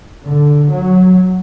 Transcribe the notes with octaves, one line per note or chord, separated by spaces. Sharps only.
D3
F#3